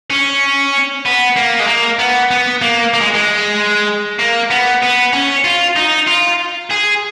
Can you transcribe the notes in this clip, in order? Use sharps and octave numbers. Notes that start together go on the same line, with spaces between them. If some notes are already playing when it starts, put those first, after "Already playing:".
C#4
B3
A#3
G#3
A#3
B3
B3
A#3
A#3
G#3
G#3
A#3
B3
B3
C#4
F4
D#4
F4
G#4